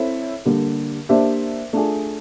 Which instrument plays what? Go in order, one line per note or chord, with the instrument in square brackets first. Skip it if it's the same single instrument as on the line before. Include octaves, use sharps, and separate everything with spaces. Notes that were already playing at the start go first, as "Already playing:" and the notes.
Already playing: [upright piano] C4 E4 A4 C#5 E5
D3 G3 A#3
A#3 D4 G4 C5 E5
A3 D4 F4 G#4